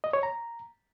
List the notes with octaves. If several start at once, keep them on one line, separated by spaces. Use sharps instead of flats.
D#5
C#5
A#5